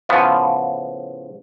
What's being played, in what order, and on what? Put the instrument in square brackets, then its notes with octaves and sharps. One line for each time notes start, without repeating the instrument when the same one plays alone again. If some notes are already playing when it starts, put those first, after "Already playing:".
[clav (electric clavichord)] A2 C#3 F3 B3